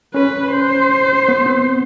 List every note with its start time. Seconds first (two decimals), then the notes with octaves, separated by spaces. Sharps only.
0.14 C#4 B4
0.52 C5
1.29 B3
1.46 C4